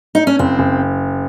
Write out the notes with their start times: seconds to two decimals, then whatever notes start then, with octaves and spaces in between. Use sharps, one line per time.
0.15 D#4
0.27 C#4
0.39 F#1 C4
0.59 F#1